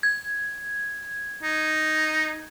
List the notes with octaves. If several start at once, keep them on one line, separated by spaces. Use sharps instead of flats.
G#6
D#4